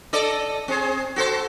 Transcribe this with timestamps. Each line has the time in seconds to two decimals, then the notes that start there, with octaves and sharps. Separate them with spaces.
0.13 A4 D5 D#5
0.68 C4 G#4
1.16 F#4 A4 C5